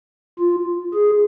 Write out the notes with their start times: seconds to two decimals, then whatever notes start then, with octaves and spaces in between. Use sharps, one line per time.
0.39 F4
0.94 G#4